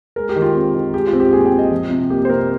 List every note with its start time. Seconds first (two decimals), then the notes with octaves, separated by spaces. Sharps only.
0.16 G#3 A#4
0.29 G4
0.36 D#3
0.42 F4
0.55 C4
0.74 D#3
0.94 G#3 G4
1.07 F4
1.13 C4
1.20 G4
1.33 A#2 G#4
1.45 G5
1.52 C4
1.59 D#5
1.71 F3
1.91 C3
2.10 A#3 G4
2.25 C5
2.30 C3 A#4